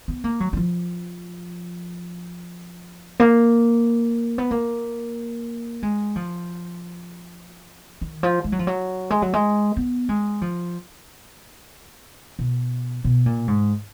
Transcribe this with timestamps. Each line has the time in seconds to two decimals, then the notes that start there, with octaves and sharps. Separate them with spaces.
0.08 B3
0.24 A#3
0.40 F#3
0.53 F#3
0.57 F3
3.20 A#3
4.38 B3
4.51 A#3
5.83 G#3
6.16 F3
8.01 D#3
8.23 F3
8.44 G#3
8.52 F#3
8.59 F3
8.67 F#3
9.10 G#3
9.22 F#3
9.33 G#3
9.77 B3
10.09 G#3
10.41 F3
12.39 B2
13.04 B2
13.26 A#2
13.48 G#2